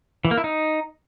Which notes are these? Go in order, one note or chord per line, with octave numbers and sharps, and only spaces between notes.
E3
A#3
E4
D#4